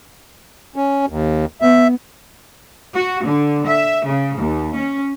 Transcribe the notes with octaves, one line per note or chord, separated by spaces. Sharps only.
C#4
D#2
B3 E5
F#4
D3
E5
C#3
D#2
C#4